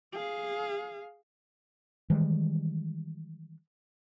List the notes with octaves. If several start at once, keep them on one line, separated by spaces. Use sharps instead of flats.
G#4 F5
D#3 E3 G3 G#3